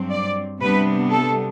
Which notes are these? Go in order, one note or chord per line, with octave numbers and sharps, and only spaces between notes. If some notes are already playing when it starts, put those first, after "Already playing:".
Already playing: G2 F#3 C4
D5
C3 G3 B3 D4 B4
A4